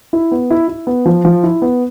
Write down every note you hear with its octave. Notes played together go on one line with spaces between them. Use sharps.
E4
B3
E4
E4
B3
F3
F3
E4
B3